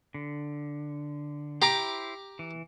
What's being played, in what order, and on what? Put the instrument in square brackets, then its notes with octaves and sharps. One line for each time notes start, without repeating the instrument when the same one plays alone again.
[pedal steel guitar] D3
[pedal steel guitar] E4 C5 [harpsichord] G4 A#5 D6
[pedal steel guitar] E3